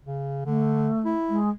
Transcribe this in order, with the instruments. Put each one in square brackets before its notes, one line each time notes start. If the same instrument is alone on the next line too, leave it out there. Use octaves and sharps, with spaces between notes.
[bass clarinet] C#3
[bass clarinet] D3 [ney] A3
[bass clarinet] E4
[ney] G#3